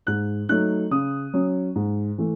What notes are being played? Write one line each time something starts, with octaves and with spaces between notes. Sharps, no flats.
G#2 F#6
F#3 A3 D#4 F#6
C#3 D#6
F#3 C#4
G#2
E3 A3